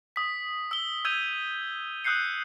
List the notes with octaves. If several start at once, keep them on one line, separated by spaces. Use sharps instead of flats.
D#6 B6
E6 G7
E6 G6 G#6 D#7 F7
D#6 E6 F#6 G6 C7 C#7